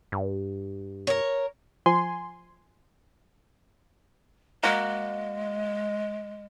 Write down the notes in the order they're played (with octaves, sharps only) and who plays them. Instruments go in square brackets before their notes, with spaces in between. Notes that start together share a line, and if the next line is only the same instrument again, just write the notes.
[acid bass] G2
[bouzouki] A#4 C#5
[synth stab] F3 G#5 C6
[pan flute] G#3 [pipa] A#3 F#4